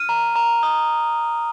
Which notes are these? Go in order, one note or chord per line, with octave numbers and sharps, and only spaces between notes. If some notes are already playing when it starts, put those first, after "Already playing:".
Already playing: F6 D#7
A#5
A#5
D#6